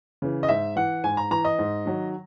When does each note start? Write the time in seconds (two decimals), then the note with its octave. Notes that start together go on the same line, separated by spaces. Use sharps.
0.22 C#3 E3
0.43 D#5
0.49 G#2 E5
0.76 E3 F#5
1.04 G#2 G#5
1.17 A#5
1.31 E3 A#5
1.45 D#5
1.59 G#2
1.86 D#3 F#3